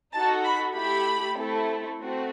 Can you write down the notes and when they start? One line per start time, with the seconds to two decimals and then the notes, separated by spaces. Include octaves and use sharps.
0.13 D#4 F#4 A4 A5
0.45 B5
0.75 A3 E4 G4 B5
1.36 A3 C4 E4 A4
1.98 A3 C4 F#4